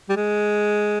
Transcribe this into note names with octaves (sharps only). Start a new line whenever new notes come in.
G3
G#3